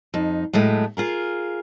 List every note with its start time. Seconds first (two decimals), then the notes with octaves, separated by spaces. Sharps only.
0.14 F2 D#4
0.53 A2 F#3 G#3 A3
0.97 F4 G#4 A#4